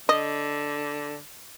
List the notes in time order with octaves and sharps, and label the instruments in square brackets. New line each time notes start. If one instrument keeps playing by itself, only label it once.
[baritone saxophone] D3 [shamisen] D#5